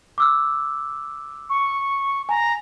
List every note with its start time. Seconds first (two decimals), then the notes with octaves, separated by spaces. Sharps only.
0.18 D6 E6 F6
1.49 C#6
2.29 G#5 A#5